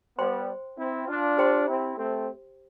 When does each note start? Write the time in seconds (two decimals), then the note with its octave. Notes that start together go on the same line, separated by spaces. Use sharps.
0.18 G3 B3 C5 G5 C6
0.77 C4 E4
1.07 D4 F4
1.37 G4 C5 G5 C6
1.67 C4 E4
1.97 A3 C4